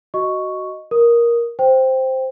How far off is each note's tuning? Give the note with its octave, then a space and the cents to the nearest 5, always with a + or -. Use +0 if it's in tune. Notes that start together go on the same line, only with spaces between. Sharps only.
F#4 +10 D#5 +0 C#6 +0
A#4 +10 D#6 +0
C5 +0 G5 +0